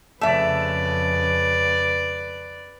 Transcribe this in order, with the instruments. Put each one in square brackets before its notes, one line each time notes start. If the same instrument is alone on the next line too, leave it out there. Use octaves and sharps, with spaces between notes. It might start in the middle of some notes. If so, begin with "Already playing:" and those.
[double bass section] F2 C#3 [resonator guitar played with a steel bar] A3 E5 [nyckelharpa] B4 D5